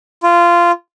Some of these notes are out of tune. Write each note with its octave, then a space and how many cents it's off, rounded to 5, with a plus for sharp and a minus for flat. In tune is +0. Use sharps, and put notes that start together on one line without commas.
F4 -15